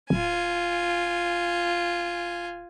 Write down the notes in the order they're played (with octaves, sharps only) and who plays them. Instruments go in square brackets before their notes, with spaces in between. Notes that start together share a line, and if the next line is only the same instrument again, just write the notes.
[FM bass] D1 [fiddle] F4 G#5